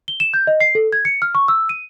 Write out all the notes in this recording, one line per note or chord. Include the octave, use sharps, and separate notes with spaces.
G7
E7
G6
D#5
C7
A4
G#6
C#7
F6
C#6
E6
D#7